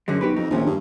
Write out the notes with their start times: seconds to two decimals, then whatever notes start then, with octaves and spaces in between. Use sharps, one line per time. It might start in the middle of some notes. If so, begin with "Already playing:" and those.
0.08 F#2 D3 F#3 G#3
0.21 B1 F#4 G4 B4
0.36 F2 D#4
0.51 A#1 D#2 A2 C#4
0.66 G2